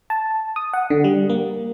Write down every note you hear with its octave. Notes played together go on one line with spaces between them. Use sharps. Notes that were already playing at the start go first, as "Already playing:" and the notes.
A5
D#6
F#5
D3
G3
A#3